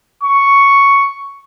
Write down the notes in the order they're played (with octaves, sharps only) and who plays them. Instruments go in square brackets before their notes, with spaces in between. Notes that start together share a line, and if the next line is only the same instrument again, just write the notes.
[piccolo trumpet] C#6